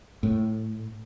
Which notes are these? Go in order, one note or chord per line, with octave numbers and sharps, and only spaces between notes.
A2